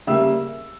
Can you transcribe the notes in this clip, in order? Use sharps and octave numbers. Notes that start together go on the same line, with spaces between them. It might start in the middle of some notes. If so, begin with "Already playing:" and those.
C#3 G3 A#3 E5 E6